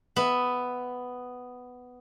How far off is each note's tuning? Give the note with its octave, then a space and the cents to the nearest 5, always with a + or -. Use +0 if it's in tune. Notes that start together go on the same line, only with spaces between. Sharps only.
B3 +10 E5 +0